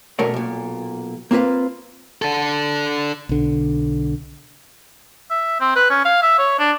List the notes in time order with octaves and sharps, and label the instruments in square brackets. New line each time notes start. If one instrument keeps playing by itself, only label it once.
[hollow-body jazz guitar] F#2 B2 A3 A#4 C#5 D5
B1 A#2
A#3 C4 F4 A#4 B4 F5
[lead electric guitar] D4 A4
[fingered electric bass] B1 D3
[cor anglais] E5
C4
B4
C#4
F5
E5
C#5
D4